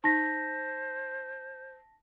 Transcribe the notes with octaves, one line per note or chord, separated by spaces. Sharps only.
D#4 C5 A5 A#6 B6